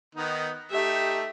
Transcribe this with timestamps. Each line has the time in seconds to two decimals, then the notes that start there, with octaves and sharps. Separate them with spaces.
0.15 D#3 B3 D#4
0.72 A3 D#4 G4 E5